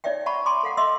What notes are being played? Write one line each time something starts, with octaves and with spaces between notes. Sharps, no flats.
D#4 C#5 D5 E5 G5
E5 F#5 A5 B5 C#6
G#5 A5 B5 C6 D6
A4 F5 F#5
D#5 E5 C6 D6 E6